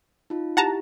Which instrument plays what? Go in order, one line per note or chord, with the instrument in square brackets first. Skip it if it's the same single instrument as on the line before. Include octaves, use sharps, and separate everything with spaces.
[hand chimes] D#4 F4
[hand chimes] E4 G4 [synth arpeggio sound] F#5 A5 A#5